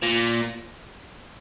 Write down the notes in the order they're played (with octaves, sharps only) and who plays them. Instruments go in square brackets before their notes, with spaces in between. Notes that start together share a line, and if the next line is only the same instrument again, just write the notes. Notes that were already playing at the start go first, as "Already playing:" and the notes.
[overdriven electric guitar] A#2